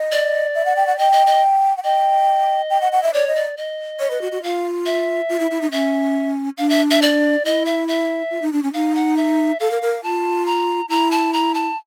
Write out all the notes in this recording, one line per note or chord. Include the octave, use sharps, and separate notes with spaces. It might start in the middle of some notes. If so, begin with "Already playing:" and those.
Already playing: D#5
D5
E5
F#5
G5
F#5
D#5 G5
D#5
D#5
F#5
D#5 G5
G5
F#5
F#5
E5
C#5 D5
D#5
D5
D#5
C#5
B4
F#4
F#4
F4 F5
E5
F4
E4
E4
D#4
C#4 E5
D4 F5
E5
E5
D5
E4 D#5
E5
E5
F4
D#4
D4
C#4
D#4 F5
F#5
E5
A4 F5
A#4
A#4
F4 A5
A#5
E4 A#5
A5
A#5
A5